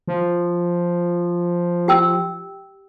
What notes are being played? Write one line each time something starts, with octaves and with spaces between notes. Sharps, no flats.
F3
G4 G5 E6